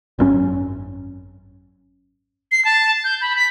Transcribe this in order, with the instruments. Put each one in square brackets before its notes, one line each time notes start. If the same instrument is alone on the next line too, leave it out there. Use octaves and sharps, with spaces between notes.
[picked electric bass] G#1 F#2 C#4
[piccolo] C7
A5
G6
B5
B6